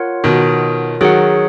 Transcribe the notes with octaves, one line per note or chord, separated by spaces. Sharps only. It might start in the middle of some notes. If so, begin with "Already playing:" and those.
Already playing: F4 A#4 C#5 F#5
B2 D#3
D#3 F#3 G#4 C#5 F#5